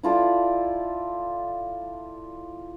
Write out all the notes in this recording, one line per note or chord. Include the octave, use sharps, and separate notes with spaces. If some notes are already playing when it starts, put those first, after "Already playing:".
E4 F4 A4 D5